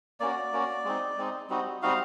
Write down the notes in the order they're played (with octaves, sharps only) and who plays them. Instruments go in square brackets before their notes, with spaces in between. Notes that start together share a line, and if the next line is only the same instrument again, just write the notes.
[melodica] A#3 C#4 F#4 D5
A#3 C#4 F#4
G#3 C4 D#4
G#3 C4 D#4
G3 C4 D#4 F#4
G3 C4 D#4 F#4 F5